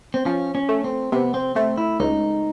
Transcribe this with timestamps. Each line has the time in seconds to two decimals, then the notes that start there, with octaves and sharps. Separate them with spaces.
0.14 C4
0.25 F3 C#4
0.55 C#4
0.69 A3
0.84 C4
1.12 C3 B3
1.34 C4
1.55 A3 C4
1.78 E4
2.00 C#2 D#4